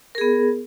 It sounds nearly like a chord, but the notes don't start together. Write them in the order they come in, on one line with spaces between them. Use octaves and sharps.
A#4 G#4 B3